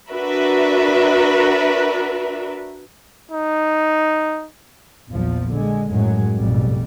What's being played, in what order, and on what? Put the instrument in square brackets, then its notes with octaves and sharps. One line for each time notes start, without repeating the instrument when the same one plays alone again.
[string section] D4 F#4 A#4 B4 E5
[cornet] D#4
[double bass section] A#1 E2 F3
D3 G#3
F#2 A2 F#3 G#3
A1 F2 G#2 B2 G3